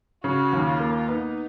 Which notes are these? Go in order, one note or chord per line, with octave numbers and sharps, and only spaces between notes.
C#3 F#4
D#2
F4
A#3
B3 D#4